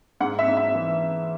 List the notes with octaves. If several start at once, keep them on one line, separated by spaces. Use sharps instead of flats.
G#2 F#5
E5
G#2
E5
E3